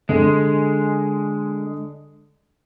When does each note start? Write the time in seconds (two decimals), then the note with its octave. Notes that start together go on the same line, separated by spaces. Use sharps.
0.09 D3 G#3 D4